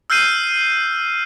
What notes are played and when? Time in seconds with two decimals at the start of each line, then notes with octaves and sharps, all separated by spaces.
0.10 E6 F6 G6 C7 D#7